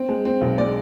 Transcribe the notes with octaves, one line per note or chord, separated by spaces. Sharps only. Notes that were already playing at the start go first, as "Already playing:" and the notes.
Already playing: C4
G#3
C4
B1
G#3 D5